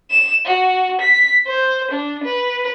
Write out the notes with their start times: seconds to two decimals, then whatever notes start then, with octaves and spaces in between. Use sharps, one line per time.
0.11 E7
0.46 F#4
1.01 B6
1.47 C5
1.92 D4
2.24 B4